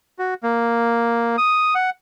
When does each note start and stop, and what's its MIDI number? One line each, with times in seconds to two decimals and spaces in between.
0.19 0.34 66
0.43 1.36 58
1.38 1.74 87
1.75 1.90 78